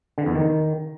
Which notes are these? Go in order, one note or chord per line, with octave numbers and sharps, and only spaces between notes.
D3
E2
D#3